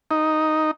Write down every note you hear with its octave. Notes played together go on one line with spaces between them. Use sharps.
D#4